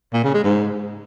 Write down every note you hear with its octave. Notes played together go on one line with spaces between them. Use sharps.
A#2
C#3
G#3
G#2